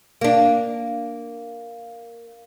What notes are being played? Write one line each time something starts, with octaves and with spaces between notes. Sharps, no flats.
A#3 D4